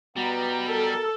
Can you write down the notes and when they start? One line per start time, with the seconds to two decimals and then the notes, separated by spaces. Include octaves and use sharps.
0.17 B2 G3 B3 A#5
0.68 A4 A#4